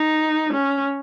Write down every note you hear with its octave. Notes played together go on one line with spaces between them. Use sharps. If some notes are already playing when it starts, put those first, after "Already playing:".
Already playing: D#4
C#4